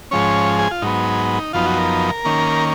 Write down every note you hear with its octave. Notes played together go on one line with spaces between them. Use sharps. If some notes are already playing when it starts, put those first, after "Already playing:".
G#2 F3 G#3 C#4 C#5
G#4
F4
G#2 F#3 B3 D#4
F#2 F3 B3 D#4 F4
F#4
A#4
D#3 A#3 C#4